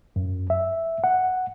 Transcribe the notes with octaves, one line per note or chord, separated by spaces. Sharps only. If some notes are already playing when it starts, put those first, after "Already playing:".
F#2
E5
F#5